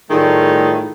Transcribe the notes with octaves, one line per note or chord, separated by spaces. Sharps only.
A2 D#3 G3 A3 F4 G#4